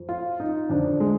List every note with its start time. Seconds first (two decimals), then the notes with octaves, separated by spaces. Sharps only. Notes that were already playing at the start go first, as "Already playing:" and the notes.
Already playing: F2 F3
0.09 F4
0.40 D#4
0.70 F2 D3 F3 D4
1.00 G#3